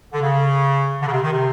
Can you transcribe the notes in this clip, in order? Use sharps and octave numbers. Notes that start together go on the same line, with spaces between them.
D3
C#3
D3
C#3
C3
D#3
C3